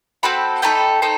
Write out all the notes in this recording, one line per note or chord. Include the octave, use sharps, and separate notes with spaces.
C4 F#4 A4 G5 B5
A3 D#4 A4 G5 B5
C4 D#4 A4